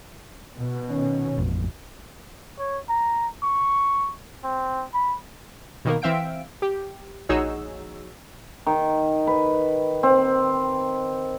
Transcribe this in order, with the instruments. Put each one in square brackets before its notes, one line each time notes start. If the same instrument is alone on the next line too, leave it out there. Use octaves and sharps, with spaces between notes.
[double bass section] B2
[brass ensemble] D#3 C#4
[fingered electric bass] A1 F2
[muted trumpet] C#5
A#5
C#6
C4
B5
[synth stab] B2 D#3 A#3 A#4
E3 C4 E5 F5 G5 D7
G4
A#1 D#4 F#4 G#4 C#5 E6
[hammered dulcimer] D#3
B4
C4